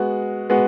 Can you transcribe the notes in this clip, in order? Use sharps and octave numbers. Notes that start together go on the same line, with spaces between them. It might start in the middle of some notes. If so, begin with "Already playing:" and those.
Already playing: G#3 B3 F#4
G#3 B3 F#4